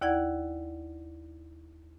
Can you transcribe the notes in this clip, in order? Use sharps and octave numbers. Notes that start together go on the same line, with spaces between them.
D#2 E4 D5 F#5 G#6